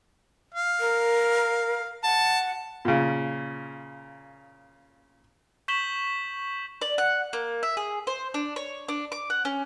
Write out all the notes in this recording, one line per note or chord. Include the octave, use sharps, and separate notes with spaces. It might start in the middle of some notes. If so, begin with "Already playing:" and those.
F5
A#4
F#5 A5
A#2 C#3
C#6 G6 B6 E7 F#7 G7
D5
F#5
A#3
E5
G#4
C5
D4
C#5
D4
D6
F#5
C#4